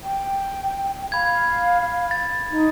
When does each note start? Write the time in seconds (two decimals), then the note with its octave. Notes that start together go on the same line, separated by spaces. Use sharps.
0.03 G5
1.12 F5 B5 G#6
2.11 A6
2.51 D#4